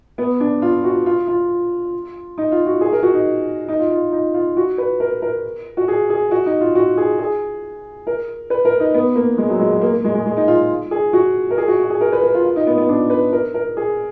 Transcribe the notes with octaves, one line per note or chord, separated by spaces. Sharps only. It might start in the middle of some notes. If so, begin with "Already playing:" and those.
B3
D4
F4
F#4
F4
F4
D#4
F4
F#4
G#4
A#4
F#4
D#4
D#4
F4
F4
D#4
F4
F#4
B4
A#4
A#4
F#4
G#4
G#4
F#4
D#4
F4
F#4
G#4
G#4
A#4
B4
A#4
D#4
B3
A#3
G#3
F#3
G#3
F#3
A#3
A#3
G#3
G#3
G#3
D#4
F4
G#4
F#4
A#4
G#4
F#4
F#4
G#4
A#4
B4
A#4
F4
F4
D#4
B3
B3
D4
B4
A#4
A#4
G#4